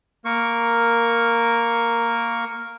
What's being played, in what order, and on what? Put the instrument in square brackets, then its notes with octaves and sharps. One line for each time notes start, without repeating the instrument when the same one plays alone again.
[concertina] A#3 A#4 C#6